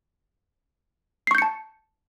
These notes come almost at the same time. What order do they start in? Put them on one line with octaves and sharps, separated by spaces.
C7 C#6 G6 C#7 A5